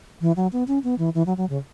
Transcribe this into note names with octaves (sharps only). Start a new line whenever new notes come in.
E3
F#3
B3
C#4
B3
E3
E3
F#3
F#3
C#3